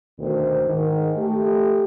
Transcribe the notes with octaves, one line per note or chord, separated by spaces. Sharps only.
D2 B2 D#3 A3 C5
G#2 D#3
A3 G4